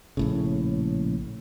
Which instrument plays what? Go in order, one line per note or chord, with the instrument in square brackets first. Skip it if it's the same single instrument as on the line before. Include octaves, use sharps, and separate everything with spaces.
[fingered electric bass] A#1 A2 C#3